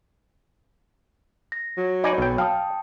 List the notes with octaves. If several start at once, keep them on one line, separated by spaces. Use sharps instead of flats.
A#6
F#3
D#4 D5 G#5 B5
B1 G5
F5 G5 A5 D#6